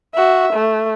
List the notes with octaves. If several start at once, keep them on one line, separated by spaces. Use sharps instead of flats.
F#4 E5
A3